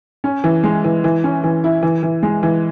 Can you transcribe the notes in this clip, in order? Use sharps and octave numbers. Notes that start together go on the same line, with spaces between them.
C#4
E3
G#3
E3
E3
C#4
E3
E4
E3
E3
G#3
E3